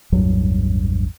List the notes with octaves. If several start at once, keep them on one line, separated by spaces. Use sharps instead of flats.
A1 E2 G2 F#3